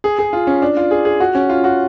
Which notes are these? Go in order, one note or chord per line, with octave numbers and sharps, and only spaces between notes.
G#4
G#4
F4
C#4
D4
F4
G#4
G#4
F#4
C#4
F4
F#4